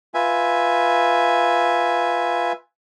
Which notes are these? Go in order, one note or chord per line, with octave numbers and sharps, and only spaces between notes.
F4 B4 E5 G#5